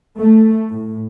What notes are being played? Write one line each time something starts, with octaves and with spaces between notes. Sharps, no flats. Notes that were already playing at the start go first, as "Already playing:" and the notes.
A3
A2